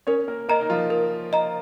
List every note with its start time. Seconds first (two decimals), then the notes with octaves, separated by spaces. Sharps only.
0.07 C#4 A#4 C#5
0.28 A#3 A#4
0.49 A#3 A#4 D#5 A#5
0.61 D#4
0.70 F3 F4
0.90 A#4
1.33 D#5 A#5